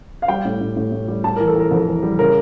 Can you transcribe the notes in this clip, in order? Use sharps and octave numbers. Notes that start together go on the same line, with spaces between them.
F5
G3 G5
A2
A2
A2
A2
G3
G3 A5
A#4
E3
A4
E3 A#4
F2
E3
G3
C#3 A#4